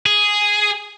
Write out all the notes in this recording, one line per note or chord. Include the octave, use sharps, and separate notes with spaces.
G#4